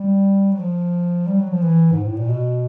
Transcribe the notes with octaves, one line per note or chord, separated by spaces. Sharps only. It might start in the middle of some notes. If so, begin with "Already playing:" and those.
Already playing: G3
F#3
F3
G3
F#3
F3
E3
G#2
A2
A#2
B2